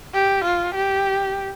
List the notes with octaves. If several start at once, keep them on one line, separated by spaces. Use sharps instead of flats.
G4
F4
G4